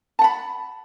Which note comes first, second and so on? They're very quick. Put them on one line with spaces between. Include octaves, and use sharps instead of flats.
A5 F#5 B5